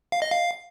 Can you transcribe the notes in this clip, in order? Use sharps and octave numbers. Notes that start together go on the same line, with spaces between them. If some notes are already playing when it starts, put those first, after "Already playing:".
F5
D#5
F5